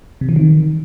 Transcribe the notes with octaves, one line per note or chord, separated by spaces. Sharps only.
C3
E3
D#3